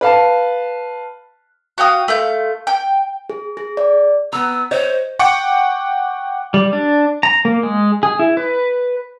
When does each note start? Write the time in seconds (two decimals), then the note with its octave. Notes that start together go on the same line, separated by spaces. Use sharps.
0.01 B4 F5 A5
1.78 F#4 F5 G5 D#6
2.08 A3 F4 G6
2.67 G5
3.30 G#4
3.57 G#4
3.77 D5
4.33 B3 A#5 E6
4.71 C5 C#5 D#5
5.19 F#5 G5 C#6 D6 C#7
6.54 G3
6.73 D4
7.23 A#5
7.45 A#3
7.63 G#3
8.03 G#4
8.19 E4
8.37 B4